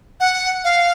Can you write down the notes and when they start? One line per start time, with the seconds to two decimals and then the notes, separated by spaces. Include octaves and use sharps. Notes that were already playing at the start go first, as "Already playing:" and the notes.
0.20 F#5
0.64 F5